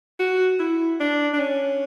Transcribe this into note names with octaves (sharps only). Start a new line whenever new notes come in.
F#4
E4
D4
D4
C#4